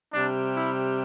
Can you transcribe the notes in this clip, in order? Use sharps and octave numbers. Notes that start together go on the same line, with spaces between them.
C3 G3 D4
E4